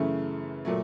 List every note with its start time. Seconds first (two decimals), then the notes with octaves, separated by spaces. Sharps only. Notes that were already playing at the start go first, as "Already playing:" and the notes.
Already playing: F#2 C#3 E3 A3
0.65 A#2 F#3 A3